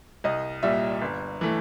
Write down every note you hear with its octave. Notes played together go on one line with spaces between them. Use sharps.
C2 D#5
A#2 G3 E5
G1
E3 A3